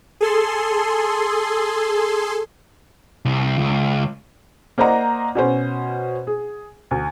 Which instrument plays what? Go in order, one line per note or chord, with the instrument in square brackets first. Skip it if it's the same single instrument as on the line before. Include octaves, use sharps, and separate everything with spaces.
[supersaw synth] G#4 A4 C6
[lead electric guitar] C2
C#2
[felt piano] A#3 C5 D5 D#5 F#5 A#5
B2 C#4 C5
G#4
D2